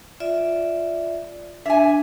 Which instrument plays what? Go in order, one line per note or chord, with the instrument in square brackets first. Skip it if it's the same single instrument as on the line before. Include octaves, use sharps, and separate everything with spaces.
[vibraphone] F4 D5 E5
[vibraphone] D4 [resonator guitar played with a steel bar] E5 G#5